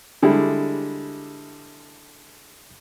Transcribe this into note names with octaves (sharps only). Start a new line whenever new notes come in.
D3 G3 G#3 E4